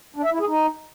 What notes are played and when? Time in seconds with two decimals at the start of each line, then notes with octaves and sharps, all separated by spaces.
0.16 D4
0.24 E5
0.32 E4
0.40 G#4
0.48 D#4